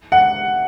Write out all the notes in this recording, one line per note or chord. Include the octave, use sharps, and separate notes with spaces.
F#5